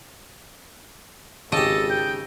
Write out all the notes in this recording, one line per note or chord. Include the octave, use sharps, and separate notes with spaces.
G#1 C#3 G4 A4 D#5 A5
G5